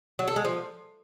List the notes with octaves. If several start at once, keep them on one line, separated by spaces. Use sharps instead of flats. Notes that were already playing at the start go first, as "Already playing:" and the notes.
F#3
A4
G#3
F3